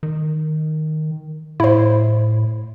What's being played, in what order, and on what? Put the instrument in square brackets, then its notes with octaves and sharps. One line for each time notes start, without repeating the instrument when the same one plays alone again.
[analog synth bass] D#3
[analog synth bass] A2 [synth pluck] E4 C5